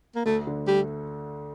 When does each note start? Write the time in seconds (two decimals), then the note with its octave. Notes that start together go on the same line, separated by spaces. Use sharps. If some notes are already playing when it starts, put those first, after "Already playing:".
0.15 A#3
0.25 D2 A3
0.47 D3
0.67 G3 A3